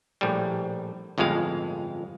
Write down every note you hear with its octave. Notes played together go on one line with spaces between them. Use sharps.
A#1 A2 G3
G1 F2 A2 G#3 F5